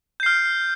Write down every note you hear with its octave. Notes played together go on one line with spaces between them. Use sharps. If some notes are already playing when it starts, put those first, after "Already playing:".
F6 G6 C7